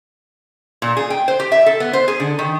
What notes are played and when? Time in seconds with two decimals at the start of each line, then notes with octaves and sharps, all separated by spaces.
0.82 A#2
0.97 G#4
1.10 G5
1.28 C5
1.40 G4
1.52 E5
1.66 A4
1.80 B3
1.93 C5
2.08 G#4
2.20 D3
2.39 D#3